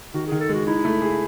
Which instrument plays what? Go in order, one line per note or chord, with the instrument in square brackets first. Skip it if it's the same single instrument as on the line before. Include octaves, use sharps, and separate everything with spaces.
[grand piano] D#3 [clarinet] F#4
[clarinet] G#4
[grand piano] D#3
[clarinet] A4
[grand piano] G#3 [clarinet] F#4
[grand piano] D#4 [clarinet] E4
[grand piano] A3
G#4